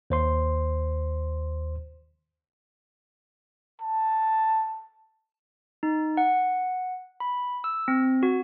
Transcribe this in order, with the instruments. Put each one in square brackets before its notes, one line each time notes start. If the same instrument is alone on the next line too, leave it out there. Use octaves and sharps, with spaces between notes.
[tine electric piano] D#2 C5 C6
[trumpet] A5
[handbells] D#4
F#5
B5
E6
C4
F#4